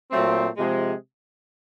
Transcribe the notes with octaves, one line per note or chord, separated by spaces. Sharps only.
A#2 F#3 A3 C4
C3 F3 G#3